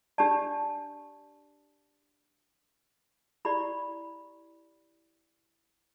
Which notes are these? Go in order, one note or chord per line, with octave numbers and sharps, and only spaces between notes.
D4 G4 D5 A5
E4 G4 D5 B5